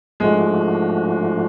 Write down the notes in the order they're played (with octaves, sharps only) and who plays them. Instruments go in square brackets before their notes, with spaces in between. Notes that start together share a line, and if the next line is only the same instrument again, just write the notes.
[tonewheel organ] G#2 F3 A3 D4 F#4 [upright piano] G#3